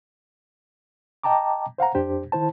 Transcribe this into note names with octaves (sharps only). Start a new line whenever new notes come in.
D#5 G5 A5 A#5 D6
C5 F5 F#5 A#5
F2 D4 G4 C5
D#3 E4 C5 A5